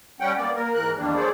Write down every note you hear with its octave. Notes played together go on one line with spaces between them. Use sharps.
G3 C#4 F#5 G5
A#3 B3 D5
A#3 A#4
G#2 E3 A#4 F#6
E2 D#3 G3 A#3 D4
F#3 A3 G#4 A4 C5 D5